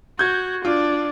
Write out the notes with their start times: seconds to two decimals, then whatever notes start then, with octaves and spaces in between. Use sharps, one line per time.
0.19 F#4 G6 G#6
0.65 D4 F4